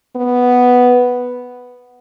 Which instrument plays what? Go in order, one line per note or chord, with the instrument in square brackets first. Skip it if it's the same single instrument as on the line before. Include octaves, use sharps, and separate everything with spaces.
[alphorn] B3